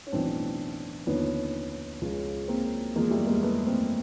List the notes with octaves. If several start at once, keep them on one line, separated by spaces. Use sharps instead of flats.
C#4
B1 A2 E3 C4 D4
D#2 D3 F3 B3 C#4
C#2 C#3 F3
A#3 C4
E2 C#3 F3 G#3 A#3
G3 A3
G#3 A#3
A3 B3
A#3 C4